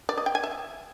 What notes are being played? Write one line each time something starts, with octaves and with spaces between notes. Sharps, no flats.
D5
D#5
G5
G#5
E5